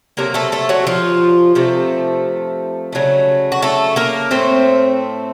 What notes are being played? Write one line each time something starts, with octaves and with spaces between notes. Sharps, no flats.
C3 F#3 A3 A#3 A#4
A3 A4
A3 A4
F#3 F#4
F3 F4
C3 F3 A3
C#3 F#3 A3
F#4
A3 A4
A#3 A#4
A2 A3 C4 C5